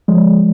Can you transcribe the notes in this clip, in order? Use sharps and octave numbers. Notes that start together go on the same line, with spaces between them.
F3 G#3